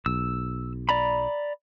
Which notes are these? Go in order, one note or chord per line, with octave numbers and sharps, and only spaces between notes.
B1 E6
D5 A#5 B5